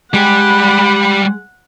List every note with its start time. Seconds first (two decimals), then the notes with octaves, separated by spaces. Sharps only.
0.13 G3 G#3 G4 G#4 F#5 B5